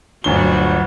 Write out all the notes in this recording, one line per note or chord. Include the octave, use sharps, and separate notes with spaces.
G1 D2 F#3 F#4 G7